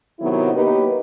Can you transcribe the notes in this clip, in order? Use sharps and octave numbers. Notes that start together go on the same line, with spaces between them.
C3 D#3 F#3 B3 E4
A#3 D#4 G4 B4